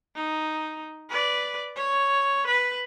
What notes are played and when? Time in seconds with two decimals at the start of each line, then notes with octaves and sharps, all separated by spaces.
0.15 D#4
1.10 B4 D5
1.76 C#5
2.47 B4